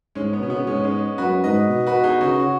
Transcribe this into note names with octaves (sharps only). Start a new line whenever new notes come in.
G#2 G#3 C#4
B3
B2 C#4
C#3 B3
B2
G#2 G#3 C#4
G#3 C#4
F#2 F#4 B4
G#2 B4 D#5
B2
F#4 B4
D#4 G#4
C#3 C#4 F#4
F#4